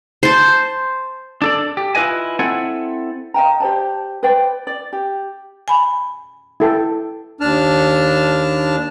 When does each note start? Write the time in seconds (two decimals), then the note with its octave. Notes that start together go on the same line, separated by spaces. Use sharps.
0.23 C5 A5
1.42 D4 A4 D5
1.77 G4
1.95 E4 F4 B4 D#5 G#5
2.39 C4 E4 A4 F#5 G#5
3.34 D#5 F5 G5 A#5
3.60 G4 C5 D5 A5
4.23 B4 C5 D5 G5
4.67 D5
4.93 G4
5.68 G#5 B5
6.60 E4 A4 G5
7.41 D#2 D4 A5 F6